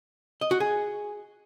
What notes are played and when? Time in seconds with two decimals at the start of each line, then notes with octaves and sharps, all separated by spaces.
0.41 D#5
0.51 F#4
0.60 G#4